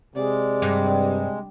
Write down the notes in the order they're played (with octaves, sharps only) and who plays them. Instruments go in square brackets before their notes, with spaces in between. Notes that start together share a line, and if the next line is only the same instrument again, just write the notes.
[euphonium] C3 [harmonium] G#3 [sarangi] D5
[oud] G2